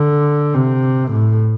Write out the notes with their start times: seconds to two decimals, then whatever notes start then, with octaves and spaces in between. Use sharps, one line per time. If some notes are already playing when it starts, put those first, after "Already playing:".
Already playing: D3
0.54 C3
1.12 A2